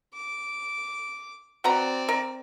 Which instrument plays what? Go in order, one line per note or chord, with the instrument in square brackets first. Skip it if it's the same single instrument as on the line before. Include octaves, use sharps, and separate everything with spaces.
[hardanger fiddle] D6
[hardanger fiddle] C4 D5 [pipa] F#4 B4 A#5
[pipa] A#4